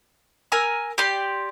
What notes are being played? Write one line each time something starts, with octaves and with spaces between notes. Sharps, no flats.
A#4 G#5 E6
G4 D5 C6